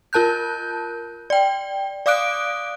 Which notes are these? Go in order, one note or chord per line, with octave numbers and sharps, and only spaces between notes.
F4 A#4 A5 F#6 G6
D5 G5
D5 F5 D6 D#6 F#6 D7